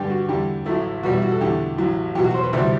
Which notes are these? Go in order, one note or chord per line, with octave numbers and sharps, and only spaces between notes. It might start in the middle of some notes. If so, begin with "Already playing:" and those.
Already playing: G2 D3 G3 G4
F#4
E2 D3 G3 G4
A1 A2 F#3 A3 E4
E2 B2 G3 F#4
E4
F#4
A4
E2 D3 A3 G4
A1 A2 F#3
E2 B2 F#3 G4
F#4
C5
B4
D2 C3 E3 G3